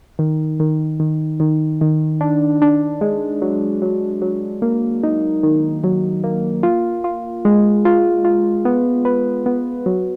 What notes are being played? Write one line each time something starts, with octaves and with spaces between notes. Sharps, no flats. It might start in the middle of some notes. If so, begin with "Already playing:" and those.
D#3
D#3
D#3
D#3
D#3
D4
D4
G#3
F#3
F#3
F#3
A#3
D#4
D#3
F#3
A#3
F4
F4
G#3
F4
F4
B3
B4
B3
F#3